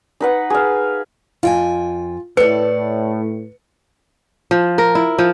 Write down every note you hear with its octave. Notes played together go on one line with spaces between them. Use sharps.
D#4 B4 F#5
G#4 F5
F2 F4 G5 G#5
A2 A4 B4 D5 C#7
F3
A#4
E4
F3